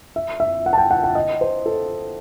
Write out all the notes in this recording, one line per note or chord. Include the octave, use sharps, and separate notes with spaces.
E5
E5
F#5
A5
G5
F#5
F#5
D#5
C5
A4